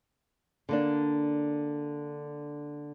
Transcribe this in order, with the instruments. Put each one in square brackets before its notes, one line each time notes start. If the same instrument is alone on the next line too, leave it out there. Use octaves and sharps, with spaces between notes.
[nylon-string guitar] D3 A#3 D4